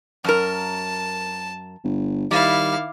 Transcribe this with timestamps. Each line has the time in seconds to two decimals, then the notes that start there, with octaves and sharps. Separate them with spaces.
0.24 F#2 A#4 A5
1.84 G1
2.31 D#3 G3 E4 F5